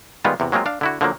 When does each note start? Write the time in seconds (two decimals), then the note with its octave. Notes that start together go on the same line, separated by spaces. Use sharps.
0.25 D#3 G3 G#3 B3 F4
0.40 E2 C3
0.52 F#3 G#3 A#3 C4 F4
0.66 D4 F5
0.81 D3 E4 F#4
1.01 D3 F3 F#3 A#3